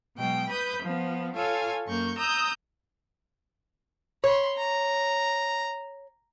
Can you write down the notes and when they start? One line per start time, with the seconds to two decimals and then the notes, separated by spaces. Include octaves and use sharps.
0.16 B2 F#3 G#3 G5
0.49 B4 B5 D#6 G6
0.82 F3 B3
1.34 F4 A4 C#5 G#5
1.86 F#2 A#3 C#6 G6
2.16 A#5 D#6 E6 G6
4.24 C#5 B5 C6
4.57 A#5